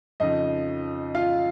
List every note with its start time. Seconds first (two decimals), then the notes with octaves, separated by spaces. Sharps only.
0.20 F2 C#3 F3 D#4 D#5
1.15 F4 F5